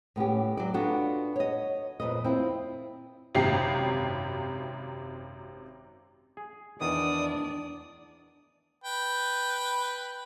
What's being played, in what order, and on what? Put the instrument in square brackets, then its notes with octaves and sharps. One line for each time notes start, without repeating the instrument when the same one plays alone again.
[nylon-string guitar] A2 B3 C#4 G4
F#3 D5
B3 D4 F4 F#4 A4 B4
C#5 D#5
F2 A#2 B4 D#5
C4 E4 F4
[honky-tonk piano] G#1 F#2 C3 G5 C7
[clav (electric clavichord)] G#4
[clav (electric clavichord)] E2 D#3 B3 [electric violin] D4 D5 [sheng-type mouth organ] D#6
[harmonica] B4 G5